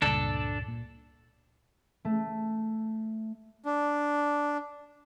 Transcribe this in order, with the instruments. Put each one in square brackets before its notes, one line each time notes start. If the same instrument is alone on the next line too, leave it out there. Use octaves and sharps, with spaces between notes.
[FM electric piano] C#2 G2 A#2 [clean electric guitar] D4 A4
[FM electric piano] A#2
[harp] A3
[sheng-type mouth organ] D4